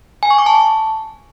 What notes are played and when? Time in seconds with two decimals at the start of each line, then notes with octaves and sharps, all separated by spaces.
0.23 G#5
0.31 C#6
0.38 D6
0.46 A5